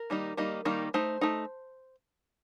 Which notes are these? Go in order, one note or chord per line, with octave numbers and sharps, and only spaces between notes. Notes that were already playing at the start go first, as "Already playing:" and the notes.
Already playing: A#4
D#3 G3 A#3 D#4
D#3 G3 A#3 D#4
D#3 G3 A#3 D#4
A3 D#4 C5
A3 D#4